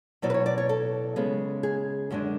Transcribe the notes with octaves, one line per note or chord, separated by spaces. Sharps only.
B2 F#3 B3 E4 D5
B4
C#5
D5
C#5
A4
C#3 G#3 B3
G#4
F#2 D3 G#3 D4